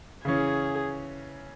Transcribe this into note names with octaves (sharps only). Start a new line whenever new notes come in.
C#3 E3 C#4 G#4